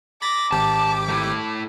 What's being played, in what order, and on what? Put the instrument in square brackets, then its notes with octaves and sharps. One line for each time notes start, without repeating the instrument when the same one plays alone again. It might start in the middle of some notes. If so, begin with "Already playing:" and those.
[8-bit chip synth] B5 A6 A#6 [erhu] D6
[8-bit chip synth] G#1 G4 [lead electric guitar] A5
[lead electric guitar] A3 E4